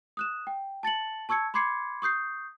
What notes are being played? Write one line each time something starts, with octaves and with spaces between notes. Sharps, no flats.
D#6 F#6 E7
G5
A5 A6 C#7 F#7
A5 C#6 E6 G#6 C#7
B5 C6 D6 G#6 C7 C#7
C#6 D#6 G6 C7